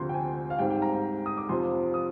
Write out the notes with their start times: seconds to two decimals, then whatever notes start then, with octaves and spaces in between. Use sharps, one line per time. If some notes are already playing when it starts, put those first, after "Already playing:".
Already playing: D2 C3 F3 C4 C6
0.09 G5
0.14 G#5
0.50 F5
0.59 G#2 G3 C4 G5
0.71 G5
0.82 A#5
0.93 A#5
1.26 D#6
1.37 D6
1.49 F2 C3 F3 C4 C6
1.94 D#6